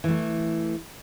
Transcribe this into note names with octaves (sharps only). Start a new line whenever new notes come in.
E3 A3